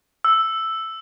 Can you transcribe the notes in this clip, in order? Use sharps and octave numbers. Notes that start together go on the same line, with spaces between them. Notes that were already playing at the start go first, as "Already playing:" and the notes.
E6